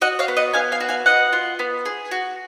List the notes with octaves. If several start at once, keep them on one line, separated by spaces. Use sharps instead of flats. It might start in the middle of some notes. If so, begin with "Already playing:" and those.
F#4 D#5 F#5
C#5 F5
B3
D#5 F#5
B3 F5 G#5
F5 G#5
F#4
F5 G#5
B3 D#5 F#5
F4
B3
G#4
F#4